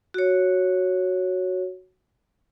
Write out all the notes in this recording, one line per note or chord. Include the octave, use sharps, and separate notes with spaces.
F#4 C#5